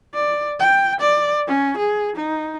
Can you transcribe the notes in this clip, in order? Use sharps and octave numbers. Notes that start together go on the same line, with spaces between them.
D5
G5
D5
C#4
G#4
D#4